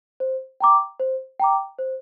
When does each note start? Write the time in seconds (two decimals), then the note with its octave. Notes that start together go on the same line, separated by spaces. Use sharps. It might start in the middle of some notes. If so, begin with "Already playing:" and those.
0.20 C5
0.60 G5 A#5 D6
1.00 C5
1.40 G5 A#5 D6
1.79 C5